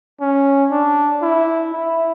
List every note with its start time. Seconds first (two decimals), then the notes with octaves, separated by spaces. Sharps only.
0.21 C#4
0.71 D4
1.22 E4
1.73 E4